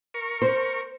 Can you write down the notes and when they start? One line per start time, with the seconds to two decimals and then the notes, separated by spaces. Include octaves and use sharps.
0.14 A#4 C#6
0.42 C5